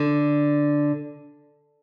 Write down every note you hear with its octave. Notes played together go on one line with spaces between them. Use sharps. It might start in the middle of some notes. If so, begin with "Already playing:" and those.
Already playing: D3